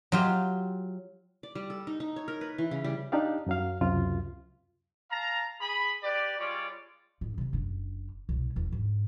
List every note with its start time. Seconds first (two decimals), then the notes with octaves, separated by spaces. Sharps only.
0.12 F#3 F4 G4
1.43 D5
1.55 G3
1.70 A4
1.87 D#4
2.00 D#4
2.16 C#5
2.28 A#4
2.41 B4
2.58 E3
2.71 C#3
2.84 G3
3.12 D4 D#4 G4 D5 F5
3.47 F#2 F#3 F5
3.81 C#2 F#2 C3 F4
5.11 F5 A5 A#5
5.61 G#4 B5
6.04 G4 B4 D5
6.39 G3 G#3 F4 C#5 D5
7.21 A1 F2
7.38 C3 C4
7.53 F#1 D4
8.29 C2 B2
8.56 E1 E2
8.71 G#2 D3